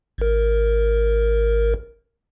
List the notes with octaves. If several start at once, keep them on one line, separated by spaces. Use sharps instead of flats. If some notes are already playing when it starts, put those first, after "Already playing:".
G#1 A#4